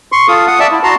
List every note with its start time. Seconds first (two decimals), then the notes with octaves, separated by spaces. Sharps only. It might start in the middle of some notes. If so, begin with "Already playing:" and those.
0.12 C6 C#6
0.28 F4 A4 D#6
0.47 F#5 D#6
0.60 D5 E5 A5
0.71 E4
0.83 F#4 A5 A#5 C6